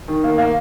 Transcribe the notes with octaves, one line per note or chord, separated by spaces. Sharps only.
D#3
A#3
A#3